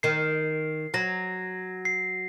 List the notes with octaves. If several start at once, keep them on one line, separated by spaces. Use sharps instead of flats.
D#3 C7
F#3 A#6
C7